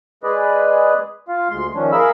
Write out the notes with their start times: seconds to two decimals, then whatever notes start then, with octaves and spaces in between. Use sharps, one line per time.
0.23 G#3 G#4 B4 D5 D#5
1.28 F4 F5
1.50 D2 G#3 C6
1.75 D#3 F3 C#4 D4
1.92 G#4 A#4 E5 F5 B5 E6